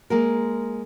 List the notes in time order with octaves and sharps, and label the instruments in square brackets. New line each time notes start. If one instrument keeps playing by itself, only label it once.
[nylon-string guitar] G#3 A#3 A#4